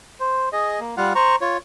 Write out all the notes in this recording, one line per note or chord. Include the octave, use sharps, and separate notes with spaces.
C5
G#4 D#5
A#3
G3 F4 F5 F#5
C5 A#5 C#6
F4 C#5